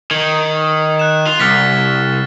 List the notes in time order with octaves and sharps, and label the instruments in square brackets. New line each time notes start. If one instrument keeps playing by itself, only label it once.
[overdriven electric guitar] D#3 [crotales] G#6
[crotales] F#6 E7
[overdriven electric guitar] F4
[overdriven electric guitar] C2 [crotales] F6 A6 B6